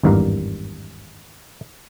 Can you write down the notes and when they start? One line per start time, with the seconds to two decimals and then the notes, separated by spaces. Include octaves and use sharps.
0.03 G#1 E2 G2 A#3 A#4 F5